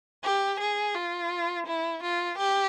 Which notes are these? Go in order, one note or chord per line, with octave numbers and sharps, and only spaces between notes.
G4
G#4
F4
E4
F4
G4